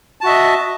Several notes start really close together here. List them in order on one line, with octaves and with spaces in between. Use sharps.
A5 F#4 E5 D#5